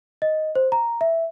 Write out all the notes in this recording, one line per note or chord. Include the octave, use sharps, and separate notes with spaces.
D#5
C5
A#5
E5